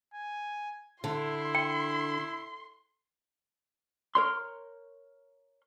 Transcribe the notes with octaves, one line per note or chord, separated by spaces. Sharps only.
G#5
D3 E4 C6
G5
A#4 C#5 C6